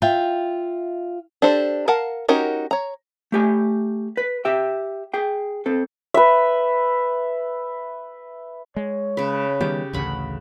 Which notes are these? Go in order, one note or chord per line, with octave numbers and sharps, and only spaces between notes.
F4 E5 G5
D4 G4 A4 C5
A#4 F5 F#5 A5
C#4 D#4 F#4 G4 A#4
C#5 A#5
A3 G4 G#5
B4
G4 E5 G5
G#4 G5
C4 A4
B4 E5
G#3 C#5
C#3 B4
D#3 G3 B3 G4
A1 D2 C#3 F#5 B5 C#6